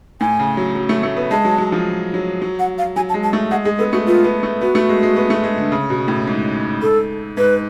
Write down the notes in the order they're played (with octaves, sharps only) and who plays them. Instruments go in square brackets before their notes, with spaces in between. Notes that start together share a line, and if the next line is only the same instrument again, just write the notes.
[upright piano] A2 [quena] G#5
[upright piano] C#3
F#3
F#3
A3
A3
B3
[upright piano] G#3 [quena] A5
[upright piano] F#3
F#3
F3
F#3
F#3
[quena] F#5
F5
[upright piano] F#3 [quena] G#5
[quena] A5
[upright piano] G#3
[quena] A5
[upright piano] A3
[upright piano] G#3 [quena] F#5
[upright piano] G#3 [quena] G#4
[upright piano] B3 [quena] A4
[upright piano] A3 [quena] F#4
[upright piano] B3 [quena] F4
[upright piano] B3
A3
[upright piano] B3 [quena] F#4
[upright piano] A3
G#3
G#3
B3
A3
G#3
D3
C#3
B2
A2
G#2
[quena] A4
[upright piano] G#2 [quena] B4